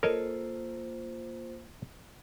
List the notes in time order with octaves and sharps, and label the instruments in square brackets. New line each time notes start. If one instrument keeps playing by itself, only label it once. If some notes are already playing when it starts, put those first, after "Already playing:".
[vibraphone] A#3 F4 C5 [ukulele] A4 [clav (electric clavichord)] A#4 C#5 D#5